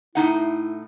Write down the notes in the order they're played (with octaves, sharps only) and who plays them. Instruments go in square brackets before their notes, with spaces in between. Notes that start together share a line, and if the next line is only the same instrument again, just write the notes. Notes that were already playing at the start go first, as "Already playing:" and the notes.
[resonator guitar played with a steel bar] A2 D#4 F#5 [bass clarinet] E4